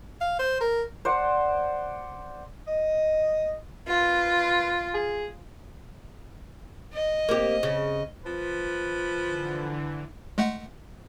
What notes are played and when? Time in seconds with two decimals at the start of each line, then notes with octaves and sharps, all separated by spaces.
0.21 F5
0.39 C5
0.61 A#4
1.05 C5 D5 F#5
2.67 D#5
3.89 F4 B4
4.94 G#4
6.94 D#5
7.29 A#3 C4 G4
7.63 C#3
8.24 F3 B4
9.21 D3 E3
10.38 G#3 A3 F#5